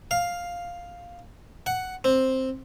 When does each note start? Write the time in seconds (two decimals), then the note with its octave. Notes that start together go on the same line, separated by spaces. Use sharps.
0.11 F5
1.66 F#5
2.04 C4